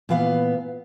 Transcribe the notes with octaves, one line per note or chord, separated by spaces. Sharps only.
A#2 E3 B3 F5